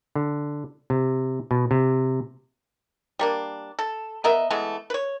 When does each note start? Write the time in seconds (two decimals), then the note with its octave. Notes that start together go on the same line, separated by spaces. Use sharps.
0.15 D3
0.90 C3
1.51 B2
1.71 C3
3.19 G3 A#3 D4
3.79 A4
4.24 B3 A#4 D#5 E5
4.50 E3 G#3 A3 B3
4.90 B4 C#5